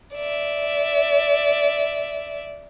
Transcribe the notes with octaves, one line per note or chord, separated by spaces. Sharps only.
D5 E5